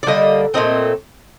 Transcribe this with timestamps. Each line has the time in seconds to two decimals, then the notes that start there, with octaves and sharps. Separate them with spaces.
0.03 D5
0.07 D3 G3 A#3 D#5
0.54 A#2 F#3 A3 C4 D#5